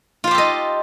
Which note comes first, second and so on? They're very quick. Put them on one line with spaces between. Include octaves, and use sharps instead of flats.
F4 C5 G4 A4 D#5